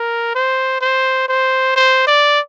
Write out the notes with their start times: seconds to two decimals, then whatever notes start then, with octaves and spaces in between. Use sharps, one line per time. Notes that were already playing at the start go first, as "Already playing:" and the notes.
Already playing: A#4
0.35 C5
0.81 C5
1.29 C5
1.76 C5
2.07 D5